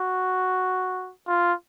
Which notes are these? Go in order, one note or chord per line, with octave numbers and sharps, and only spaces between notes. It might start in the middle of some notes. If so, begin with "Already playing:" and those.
Already playing: F#4
F4